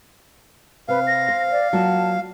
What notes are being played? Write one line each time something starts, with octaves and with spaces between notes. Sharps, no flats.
C3 B4 F5
A#6
C5
D5
F#3 A#3 F4 A5